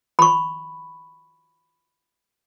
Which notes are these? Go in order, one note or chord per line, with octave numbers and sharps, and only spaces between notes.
B5 C#6